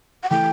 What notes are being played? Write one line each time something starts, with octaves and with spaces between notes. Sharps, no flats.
F#5
E3 A3 G5